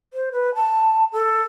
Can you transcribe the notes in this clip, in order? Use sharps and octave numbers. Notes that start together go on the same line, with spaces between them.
C5
B4
A5
A4